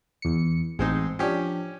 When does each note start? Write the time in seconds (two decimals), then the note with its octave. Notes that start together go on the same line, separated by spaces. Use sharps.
0.22 E2 C#7
0.79 A1 G#3 C4 D#4
1.19 F3 C#4 D4 G4